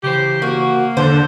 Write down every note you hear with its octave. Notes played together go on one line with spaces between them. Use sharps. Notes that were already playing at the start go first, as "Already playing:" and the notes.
C#3 E3 G4 C5
A#3 F#4
E2 D3 C5